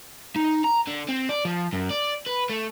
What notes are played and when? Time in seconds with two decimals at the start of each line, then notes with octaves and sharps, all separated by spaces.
0.36 D#4
0.64 A#5
0.88 D3
1.09 C4
1.29 D5
1.45 F3
1.73 F#2
1.91 D5
2.26 B4
2.49 A3